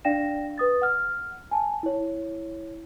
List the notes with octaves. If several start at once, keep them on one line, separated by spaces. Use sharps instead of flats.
D4 D5 F5 G5 A#6 E7
B4 D#6 A6
F#5 F6
G#5 A5
E4 C#5